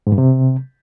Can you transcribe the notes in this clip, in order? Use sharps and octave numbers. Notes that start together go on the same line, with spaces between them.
G#2
G2
C3